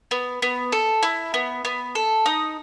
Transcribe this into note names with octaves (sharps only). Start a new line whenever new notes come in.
B3
B3
A4
E4
B3
B3
A4
D#4 D#6